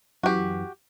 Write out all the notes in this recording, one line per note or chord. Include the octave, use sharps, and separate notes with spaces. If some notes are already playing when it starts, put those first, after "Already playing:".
F#2 E3 F#4 G4